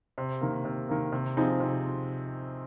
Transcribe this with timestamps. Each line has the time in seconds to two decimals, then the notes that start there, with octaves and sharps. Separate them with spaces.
0.18 C3
0.41 D#3 A#3
0.65 C3
0.89 D#3 A#3
1.12 C3
1.37 F3 C4 D#4 G#4
1.60 C3